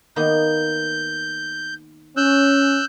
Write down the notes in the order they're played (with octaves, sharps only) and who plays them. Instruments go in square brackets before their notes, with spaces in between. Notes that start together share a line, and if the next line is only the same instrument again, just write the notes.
[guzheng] D#3 A#3 B3 [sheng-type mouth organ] G6
[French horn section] C#4 [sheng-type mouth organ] E6 F#6 G6